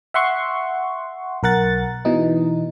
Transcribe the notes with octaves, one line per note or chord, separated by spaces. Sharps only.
E5 F#5 C6 C#6
B1 A#4 F#5 A6
B2 E3 D#4